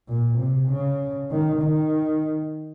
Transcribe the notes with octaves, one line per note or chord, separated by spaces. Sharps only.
A#2
C3
C#3
D#3
D#3